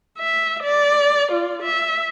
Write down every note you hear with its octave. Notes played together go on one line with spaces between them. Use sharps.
E5
D5
F4
E5